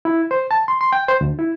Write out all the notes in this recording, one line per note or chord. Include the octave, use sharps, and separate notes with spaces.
E4
C5
A5
C6
C6
G5
C5
D2
E4